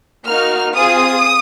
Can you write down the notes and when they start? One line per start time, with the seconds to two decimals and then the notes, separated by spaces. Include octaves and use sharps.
0.25 A#3 D#4 F#4 F6
0.74 C4 F4 G#4 D#6